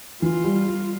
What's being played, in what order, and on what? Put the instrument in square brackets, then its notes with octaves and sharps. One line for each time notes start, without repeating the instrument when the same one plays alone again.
[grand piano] E3 [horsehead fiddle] F4
[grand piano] G3
G3